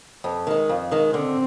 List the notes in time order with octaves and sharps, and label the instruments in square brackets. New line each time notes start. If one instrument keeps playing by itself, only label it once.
[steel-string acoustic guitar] F2
D#3 G#3
F2
D#3 G#3
[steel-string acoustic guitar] D3 [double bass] C4